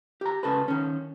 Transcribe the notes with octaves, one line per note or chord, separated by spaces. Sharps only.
G4 A#5
C#2 C#3 A4 B4
D#3 C#4